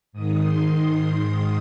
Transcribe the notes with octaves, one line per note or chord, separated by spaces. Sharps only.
G#2 D#3 D#6
C6
C6